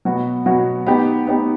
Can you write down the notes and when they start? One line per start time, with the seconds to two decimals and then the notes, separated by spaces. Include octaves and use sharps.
0.05 B2 F#3 B3 F#4
0.46 B2 F#3 B3 F#4
0.86 B3 D#4 G4
1.27 B3 D#4 G4